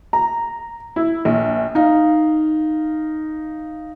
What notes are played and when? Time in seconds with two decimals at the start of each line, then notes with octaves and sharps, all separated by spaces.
0.13 A#5
0.96 E4
1.25 A#1
1.75 D#4 F5